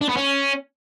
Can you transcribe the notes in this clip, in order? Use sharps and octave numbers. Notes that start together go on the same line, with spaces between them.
D4
B3
C#4